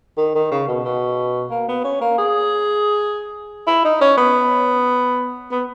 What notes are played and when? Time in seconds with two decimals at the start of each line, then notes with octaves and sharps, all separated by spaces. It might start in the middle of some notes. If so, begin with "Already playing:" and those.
0.17 D#3
0.35 D#3
0.51 C#3
0.68 B2
0.84 B2
1.50 A#3
1.68 B3
1.84 C#4
2.01 A#3
2.18 G#4
3.67 E4
3.84 D#4
4.01 C#4
4.17 B3
5.51 B3